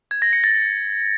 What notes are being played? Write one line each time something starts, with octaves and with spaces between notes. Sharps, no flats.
G#6
A#6
C#7
A6